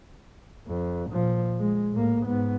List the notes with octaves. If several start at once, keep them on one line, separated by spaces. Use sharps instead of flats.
F2
A#2 F3
G#3
A2 A#3
G#2 B3